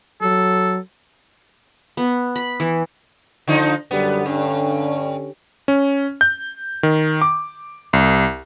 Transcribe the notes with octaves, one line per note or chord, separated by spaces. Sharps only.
F#3 A4
B3
B5
E3
D3 F3 D#4
F#2 D3 G3 B3
G2 D3 C#4
C#4
G6
D#3
D6
C2